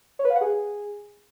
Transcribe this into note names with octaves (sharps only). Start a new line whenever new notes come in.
C#5
B4
F5
F#5
G#4